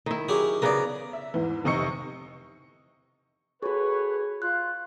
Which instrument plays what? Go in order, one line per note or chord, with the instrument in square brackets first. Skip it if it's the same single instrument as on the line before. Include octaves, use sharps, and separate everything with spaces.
[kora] D#3 E4
[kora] F#3 [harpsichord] C#4 G4 G#4
[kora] C#3 B3 A#4 [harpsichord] D5 D#6
[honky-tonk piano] E5
E2 G#2 E3
F1 C3 D#4 D#5 C#6 C#7
[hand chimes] F#4 G#4 [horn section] A4 B4 C#5
[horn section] F4 [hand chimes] F#6